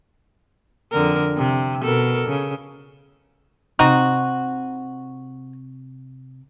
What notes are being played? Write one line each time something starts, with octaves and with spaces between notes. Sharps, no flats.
F2 D3 A#4
C3
B2 A4 A#4
C#3
C3 C4 D#4 F#4